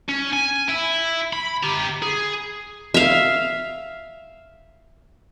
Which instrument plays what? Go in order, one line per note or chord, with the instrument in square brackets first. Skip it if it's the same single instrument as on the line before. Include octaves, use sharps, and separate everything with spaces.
[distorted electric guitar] C#4
G#5
E4
B5
G4 A#5
G#4
[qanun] E5 F5